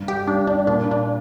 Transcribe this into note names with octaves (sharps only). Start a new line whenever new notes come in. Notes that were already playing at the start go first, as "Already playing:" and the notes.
Already playing: G2 C3
G4
G2 D4
D4
A#2 D4
D4